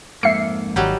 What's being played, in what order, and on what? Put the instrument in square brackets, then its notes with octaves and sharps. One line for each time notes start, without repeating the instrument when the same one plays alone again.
[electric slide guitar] F2 G#2 A#3 [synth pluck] E5 C7 C#7
[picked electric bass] G#1 D#3 [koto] F#3 G3